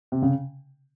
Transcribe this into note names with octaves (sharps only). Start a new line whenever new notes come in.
C3
C#3